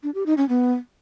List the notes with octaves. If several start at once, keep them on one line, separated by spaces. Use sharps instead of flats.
D4
G4
D#4
C#4
B3